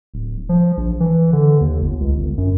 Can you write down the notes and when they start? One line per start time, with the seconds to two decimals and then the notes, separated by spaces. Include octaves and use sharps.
0.14 D1
0.49 F3
0.77 A#1
1.00 E3
1.33 D3
1.61 D#2
1.82 G1
2.00 C#2
2.17 G1
2.38 F#2